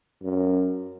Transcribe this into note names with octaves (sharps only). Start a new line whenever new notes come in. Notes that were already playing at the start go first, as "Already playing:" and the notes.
F#2